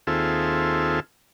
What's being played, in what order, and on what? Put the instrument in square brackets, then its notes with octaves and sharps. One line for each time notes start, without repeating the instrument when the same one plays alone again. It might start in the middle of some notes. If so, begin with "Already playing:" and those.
[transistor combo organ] D#2 C4 F4 G#4 A4 E5